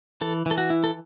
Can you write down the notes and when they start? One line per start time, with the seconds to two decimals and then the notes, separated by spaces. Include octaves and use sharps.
0.21 E3 A4
0.46 E3
0.51 A4
0.58 F#4
0.70 E4
0.84 A4